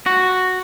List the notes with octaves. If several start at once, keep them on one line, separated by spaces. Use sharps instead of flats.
F#4